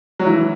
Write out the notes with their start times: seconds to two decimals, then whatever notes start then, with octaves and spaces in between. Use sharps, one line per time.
0.19 F#3
0.26 E3